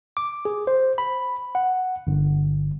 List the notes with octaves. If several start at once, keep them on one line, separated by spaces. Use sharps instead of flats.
D6
G#4
C5
B5
F#5
G1